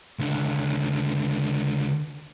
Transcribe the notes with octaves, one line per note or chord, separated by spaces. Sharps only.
C#2 D3